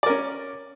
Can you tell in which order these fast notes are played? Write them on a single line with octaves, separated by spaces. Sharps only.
D5 A#4 C#4